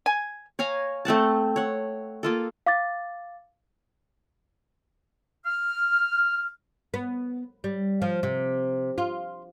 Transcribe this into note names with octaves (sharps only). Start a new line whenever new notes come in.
G#5
C#5 F5 G#5 A#5
A3 C4 F#5 A5
C#5 F#5
A#3 F4 A4
F5 D6 A6
F6
B3
G3
F3
C3
F4